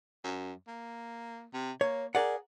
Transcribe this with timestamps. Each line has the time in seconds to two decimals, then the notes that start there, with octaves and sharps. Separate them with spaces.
0.24 F#2
0.67 A#3
1.53 C3
1.81 A#3 C#5
2.15 G#4 A#4 D5 F#5